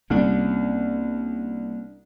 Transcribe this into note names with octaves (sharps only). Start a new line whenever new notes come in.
C2 A#3 C#4 D4